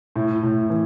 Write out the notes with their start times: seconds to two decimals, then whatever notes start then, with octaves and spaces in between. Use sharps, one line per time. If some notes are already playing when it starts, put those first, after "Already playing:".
0.16 A2 E4
0.43 A2
0.70 E3